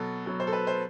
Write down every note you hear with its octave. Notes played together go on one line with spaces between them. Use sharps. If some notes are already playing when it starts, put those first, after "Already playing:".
Already playing: B2 F#3 A4
B2 F#3
C5
A4
B4
C5